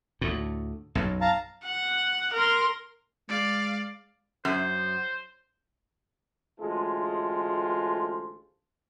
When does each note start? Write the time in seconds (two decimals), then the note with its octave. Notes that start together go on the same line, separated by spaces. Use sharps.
0.21 D2 A2
0.95 B1 F#2
1.21 F5 A5 A#5
1.65 F#5
2.34 A#4 C6
3.29 G#3 D5 F5
4.45 F#2 C5
6.59 A1 D2 G#3 F4 A4 C5